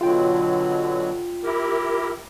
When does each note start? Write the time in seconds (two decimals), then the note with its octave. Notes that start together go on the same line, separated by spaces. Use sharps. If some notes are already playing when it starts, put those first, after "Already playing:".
0.01 B2 D3 F#3 F4 G5
1.43 E4 G4 A#4